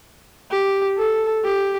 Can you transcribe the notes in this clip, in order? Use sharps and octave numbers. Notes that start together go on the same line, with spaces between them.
G4
A4
G4